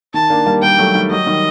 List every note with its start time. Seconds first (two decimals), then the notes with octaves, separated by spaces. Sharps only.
0.14 D#3 A5
0.30 A#3 D4
0.46 G3 A#3
0.63 G3 A#3 G5
0.79 F#3 A3
0.95 D#3 G3
1.11 F#3 D#5
1.26 D#3 G3